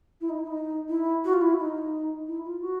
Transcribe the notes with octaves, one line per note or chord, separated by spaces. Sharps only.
E4
D#4
E4
D#4
E4
F#4
F4
E4
D#4
E4
F4
F#4